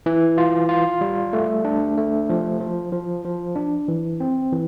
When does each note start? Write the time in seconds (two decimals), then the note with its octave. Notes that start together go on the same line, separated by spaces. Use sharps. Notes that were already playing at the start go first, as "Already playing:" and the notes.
0.06 E3
0.38 F4
0.69 F4
1.01 G3
1.33 A3
1.65 D4
1.98 A3
2.29 F3
2.61 F3
2.92 F3
3.25 F3
3.56 D4
3.88 E3
4.20 C4
4.52 E3